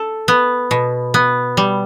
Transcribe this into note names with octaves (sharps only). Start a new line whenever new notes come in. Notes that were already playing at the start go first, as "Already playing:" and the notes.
Already playing: A4
B3
B2
B3
G3